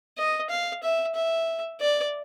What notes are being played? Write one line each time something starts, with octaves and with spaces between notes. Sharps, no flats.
D#5
F5
E5
E5
D5